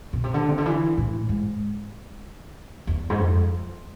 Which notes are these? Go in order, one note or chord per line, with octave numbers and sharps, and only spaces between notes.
B2
C3
D3
C3
D3
E3
A2
G#2
E2
G#2
F2